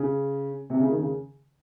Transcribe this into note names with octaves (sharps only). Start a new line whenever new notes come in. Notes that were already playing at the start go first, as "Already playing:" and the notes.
Already playing: C#3
C3
C#3
D#3
C#3